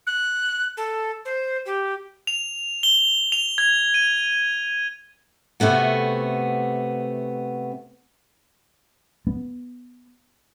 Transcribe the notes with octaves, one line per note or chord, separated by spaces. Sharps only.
F#6
A4
C5
G4
F7
G7
F7
G#6
D#7
C3 A3 B3 F#4
B3